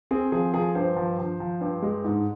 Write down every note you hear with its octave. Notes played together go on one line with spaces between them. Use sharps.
C4 G#4
F3 G#4
F3 G#4
G2 C5
F3
F3
F3
G2
G#3
G#2